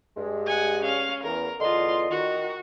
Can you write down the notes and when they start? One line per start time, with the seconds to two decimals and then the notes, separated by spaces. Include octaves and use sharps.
0.17 G2 G#3
0.46 F#5 G#5
0.83 C#4 F5
1.24 E2 A#4
1.60 E2 D3 F4 D#5 C6
2.10 D#3 F#4